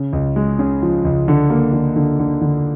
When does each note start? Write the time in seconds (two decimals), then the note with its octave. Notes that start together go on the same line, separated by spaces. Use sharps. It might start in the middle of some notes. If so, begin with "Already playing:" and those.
Already playing: C#3
0.13 C#2
0.36 G#3
0.59 C#3
0.82 F3
1.05 C#2
1.28 D3
1.50 A#3
1.73 D3
1.96 D3
2.19 D3
2.41 D3